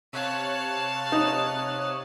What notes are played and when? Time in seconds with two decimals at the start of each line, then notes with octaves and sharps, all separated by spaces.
0.13 C3 C#5 F5 A5 F#6
1.12 D#4 D#6